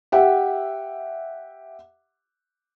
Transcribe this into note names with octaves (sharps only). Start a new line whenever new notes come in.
G4 E5 F#5